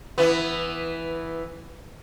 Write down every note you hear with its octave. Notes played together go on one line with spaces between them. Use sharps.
E3 B3